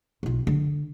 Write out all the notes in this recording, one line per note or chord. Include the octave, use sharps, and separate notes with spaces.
B1 F4
D3